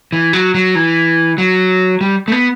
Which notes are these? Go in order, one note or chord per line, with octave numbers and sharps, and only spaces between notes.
E3
F#3
F#3
E3
F#3
G3
A3
B3